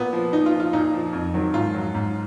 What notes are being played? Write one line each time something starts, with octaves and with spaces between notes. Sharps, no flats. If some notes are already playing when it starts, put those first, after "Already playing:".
Already playing: A#2 B3
F3
A#2 D#4
F4
F3
F4
A#2 D#4
F3
F2
D#3 F#3
G#2 F4
F#3
G#2